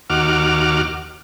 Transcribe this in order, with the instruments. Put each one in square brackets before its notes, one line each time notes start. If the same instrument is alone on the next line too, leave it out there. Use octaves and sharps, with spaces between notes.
[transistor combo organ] D#2 F#4 D6 F6